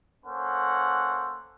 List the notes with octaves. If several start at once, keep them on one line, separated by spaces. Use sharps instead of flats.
A#3 C#4 A4 C5 F#5